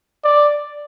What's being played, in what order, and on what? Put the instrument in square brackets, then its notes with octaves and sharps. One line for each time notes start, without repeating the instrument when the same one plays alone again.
[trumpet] D5